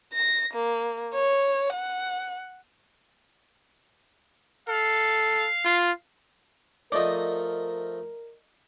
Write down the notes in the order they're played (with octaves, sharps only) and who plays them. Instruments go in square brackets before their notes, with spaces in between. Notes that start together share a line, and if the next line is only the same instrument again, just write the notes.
[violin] A#6
A#3
C#5
F#5
[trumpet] A4 [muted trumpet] F5
[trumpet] F4
[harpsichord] F3 A3 D#4 [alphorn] A#4 [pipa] D5 D#5